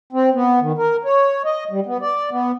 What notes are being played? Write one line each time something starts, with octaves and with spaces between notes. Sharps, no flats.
C4
B3
D#3
A#4
C#5
D#5
G3
B3
D5
B3